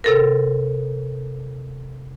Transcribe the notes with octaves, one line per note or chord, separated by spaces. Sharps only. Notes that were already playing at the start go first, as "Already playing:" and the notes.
C3 A4 A#4